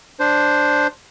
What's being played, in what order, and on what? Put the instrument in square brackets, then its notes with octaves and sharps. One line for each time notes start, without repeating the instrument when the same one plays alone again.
[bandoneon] D4 C5